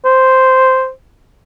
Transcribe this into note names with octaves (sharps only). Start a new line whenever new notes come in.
C5